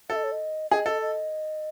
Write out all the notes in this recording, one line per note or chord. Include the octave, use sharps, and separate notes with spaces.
A4 E5
D#5
C#5
D#5
G#4 D#5
A4
D#5